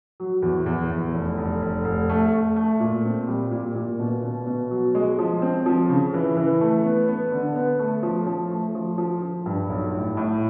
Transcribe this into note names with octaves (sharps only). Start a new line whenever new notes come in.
F#3
E2
E2
E2
F1
F1
F1
F1
A3
A3
A3
A#2
C4
G3
A#2
A#2
B2
B2
B2
F#3
G#3
F3
C4
F3
C#3
E3
E3
A3
B3
B3
D3
B3
A3
F3
F3
A3
F3
F3
F3
G2
B1
A2
A2